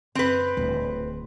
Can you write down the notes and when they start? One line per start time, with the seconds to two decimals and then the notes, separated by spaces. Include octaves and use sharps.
0.15 F#1 C4 B4
0.57 D1